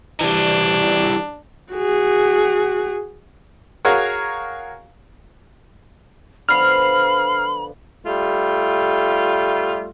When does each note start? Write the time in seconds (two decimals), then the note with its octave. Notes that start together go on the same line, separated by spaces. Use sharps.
0.21 E3 G3 D4
1.73 F#4 G#4
3.85 F#4 G#4 A#4 C#5 F5
6.49 D3 F3 B3 B5 F6 C7
8.06 G3 A3 F4